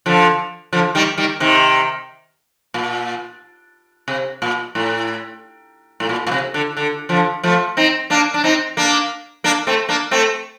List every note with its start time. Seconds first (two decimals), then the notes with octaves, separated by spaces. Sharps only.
0.06 D3 F3
0.73 D3 F3
0.95 D#3 G3
1.17 D#3 G3
1.40 C3 D#3
2.74 A#2
4.08 C3
4.42 A#2
4.75 A2
6.00 A2
6.09 A#2
6.27 A#2
6.32 C3
6.54 D3
6.77 D3
7.09 D3 F3
7.43 F3 A3
7.77 C4 D#4
8.10 A#3 D4
8.34 D4
8.44 C4 D#4
8.77 A#3 D4
9.44 A#3 D4
9.67 A3 C4
9.89 A#3 D4
10.11 A3 C4